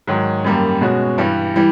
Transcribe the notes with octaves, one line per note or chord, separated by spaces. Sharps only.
G#2 D#3 F#3
F#2 D#3 G3 A#3
B2 G#3 C#4 F#4
G2 E3 G3
E3 G3